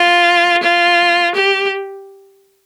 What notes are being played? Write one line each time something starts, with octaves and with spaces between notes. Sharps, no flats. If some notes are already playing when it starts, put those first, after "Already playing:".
Already playing: F4
F4
G4